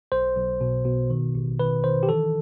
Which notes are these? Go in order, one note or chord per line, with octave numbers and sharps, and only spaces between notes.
B1 C5
B1
B2
B2
D#3
A1
D#3 B4
D#3 C5
G4
E3 A4